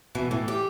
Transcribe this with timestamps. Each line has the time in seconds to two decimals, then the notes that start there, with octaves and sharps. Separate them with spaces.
0.15 B2 E3
0.31 A2 E3
0.48 G4